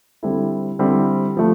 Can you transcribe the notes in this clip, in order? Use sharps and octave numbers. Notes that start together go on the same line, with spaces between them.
D3 G3 C4 E4 A4
D3 G3 C4 E4 A4
F3 A3